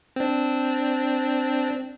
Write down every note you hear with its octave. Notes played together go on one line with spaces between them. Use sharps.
C4 D4